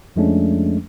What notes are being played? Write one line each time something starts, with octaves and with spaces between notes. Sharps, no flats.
F2 F3 G#3 A3 C#4 D4